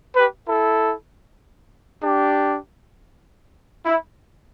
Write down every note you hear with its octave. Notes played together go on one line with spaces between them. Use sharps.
G4 B4
E4 A4
D4 G4
E4